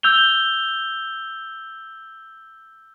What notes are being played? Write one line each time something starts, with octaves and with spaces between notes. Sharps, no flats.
E6 G6 F7 G7